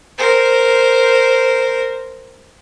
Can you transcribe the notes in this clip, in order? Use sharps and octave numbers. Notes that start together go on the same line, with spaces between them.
A#4 C5